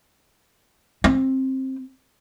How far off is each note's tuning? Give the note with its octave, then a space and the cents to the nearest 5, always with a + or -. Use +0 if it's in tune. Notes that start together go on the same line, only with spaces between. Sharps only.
C4 +15